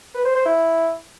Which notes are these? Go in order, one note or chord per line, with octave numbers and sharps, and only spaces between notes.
B4
C5
C5
E4